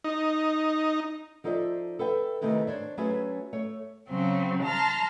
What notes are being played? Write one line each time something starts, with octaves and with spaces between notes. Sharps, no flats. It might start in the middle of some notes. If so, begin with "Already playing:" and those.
D#4
F3 D#4 A4 C5 D5 E5
A4 B4 E5 G5
C3 D#3 E3 A3 D#4
D4 C5 C#5
F#3 A3 C#4 G#4 B4 E5
A3 C#5
C#3 F#3 C4
A5 A#5 C6 F6